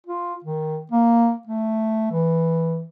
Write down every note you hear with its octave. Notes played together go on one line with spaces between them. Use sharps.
F4
D#3
A#3
A3
E3